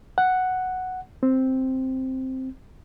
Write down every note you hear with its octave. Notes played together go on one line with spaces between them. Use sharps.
F#5
C4